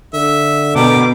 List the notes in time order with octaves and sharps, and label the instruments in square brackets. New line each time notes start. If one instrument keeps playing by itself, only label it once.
[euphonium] D3 [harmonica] E5
[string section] B2 [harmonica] A#4 G5 [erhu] D6